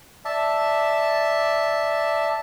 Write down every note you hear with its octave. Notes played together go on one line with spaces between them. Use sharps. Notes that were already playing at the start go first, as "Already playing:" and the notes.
D5 E5 A5